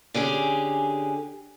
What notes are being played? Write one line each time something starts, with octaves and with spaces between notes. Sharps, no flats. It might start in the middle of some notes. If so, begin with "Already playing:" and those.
D3 C#4 G4 G#4